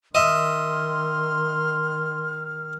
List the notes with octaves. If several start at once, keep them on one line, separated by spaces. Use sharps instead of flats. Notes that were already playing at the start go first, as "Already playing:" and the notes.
D#3 D#5 E5 C6 F6